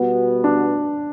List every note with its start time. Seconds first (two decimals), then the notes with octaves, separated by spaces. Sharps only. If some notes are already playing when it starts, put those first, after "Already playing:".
Already playing: B2 G3 B3
0.44 D4